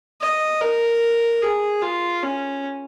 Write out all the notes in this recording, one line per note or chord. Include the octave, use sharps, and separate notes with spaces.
D#5
A#4
G#4
F4
C#4